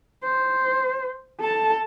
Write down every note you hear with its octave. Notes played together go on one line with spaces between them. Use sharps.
C5
A4 A5